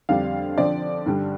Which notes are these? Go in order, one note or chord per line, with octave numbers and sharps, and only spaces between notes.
F2 D3 G3 D4 F5
D3 F3 C4 D5
G2 D3 G3